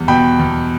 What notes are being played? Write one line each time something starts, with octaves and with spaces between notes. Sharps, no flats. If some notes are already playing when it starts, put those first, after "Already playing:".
Already playing: E2 G3
B2 G5 B5
E2